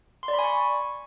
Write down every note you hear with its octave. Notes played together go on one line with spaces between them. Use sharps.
C6
D5
B5
G#5
C#6